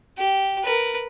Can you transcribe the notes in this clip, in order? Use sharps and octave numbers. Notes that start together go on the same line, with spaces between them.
G4
A#4 B4